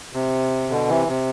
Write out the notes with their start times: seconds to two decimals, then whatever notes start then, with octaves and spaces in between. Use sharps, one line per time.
0.14 C3
0.70 B2 D3
0.88 C3 E3
1.08 C3